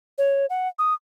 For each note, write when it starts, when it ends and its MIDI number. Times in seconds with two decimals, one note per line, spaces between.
0.18 0.46 73
0.50 0.68 78
0.79 0.94 87